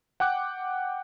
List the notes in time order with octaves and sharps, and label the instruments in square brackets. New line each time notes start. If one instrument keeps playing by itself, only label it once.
[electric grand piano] F#5 G5 D6 F#6